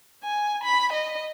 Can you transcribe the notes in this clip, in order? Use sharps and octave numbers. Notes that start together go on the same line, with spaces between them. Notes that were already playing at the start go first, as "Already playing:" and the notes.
G#5
B5
D#5